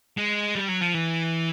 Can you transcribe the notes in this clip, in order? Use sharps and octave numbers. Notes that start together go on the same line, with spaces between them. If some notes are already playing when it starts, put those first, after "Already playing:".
G#3
G3
F#3
F3
E3